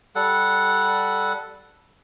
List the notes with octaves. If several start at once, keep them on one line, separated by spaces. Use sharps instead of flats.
G3 A4 F#5